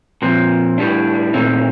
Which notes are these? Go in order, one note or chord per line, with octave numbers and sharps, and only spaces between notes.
A#2 F3 C4
A2 G3 D4
A#2 A3 C4 D#4